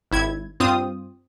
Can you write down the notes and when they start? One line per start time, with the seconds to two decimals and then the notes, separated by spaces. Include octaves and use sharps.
0.11 G#1 E4 G#6
0.60 G2 C4 F4 D#6